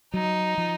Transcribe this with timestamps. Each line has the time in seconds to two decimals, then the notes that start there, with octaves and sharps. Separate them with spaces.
0.14 F#3 D#4
0.58 F3